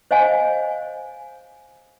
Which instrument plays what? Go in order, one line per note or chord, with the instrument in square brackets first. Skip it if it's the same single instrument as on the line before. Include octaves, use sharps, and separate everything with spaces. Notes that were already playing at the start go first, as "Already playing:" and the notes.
[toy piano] C5 C#5 D#5 F5 G#5